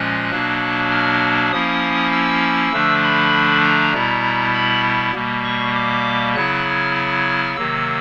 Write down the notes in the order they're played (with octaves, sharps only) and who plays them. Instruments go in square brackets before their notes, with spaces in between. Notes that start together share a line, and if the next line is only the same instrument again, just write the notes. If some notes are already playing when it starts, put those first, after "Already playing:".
Already playing: [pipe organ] A#2 F3 G#3 C#4 F#6
B2 F#3 A#3 D4
F6
F3 A#3 C#4 E4 D#6
E6
D3 F3 A3 D4
B5
A#5
B2 G3 B3 E4
B5
B2 G3 A#3
C#6
D6
C#3 F#3 B3 E4 F#6
F6
F6
C3 D#3 F#3 A#3 E6